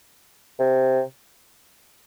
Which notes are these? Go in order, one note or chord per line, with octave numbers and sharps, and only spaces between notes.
C3